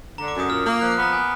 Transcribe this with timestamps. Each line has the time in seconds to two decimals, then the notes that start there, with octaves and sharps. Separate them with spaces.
0.18 D3 A#5
0.28 D6
0.34 F#2
0.40 D#6
0.50 A#2 F6
0.65 A#3 F6
0.81 F3 F#6
0.92 F#6
0.97 B3 A#5
1.13 G#5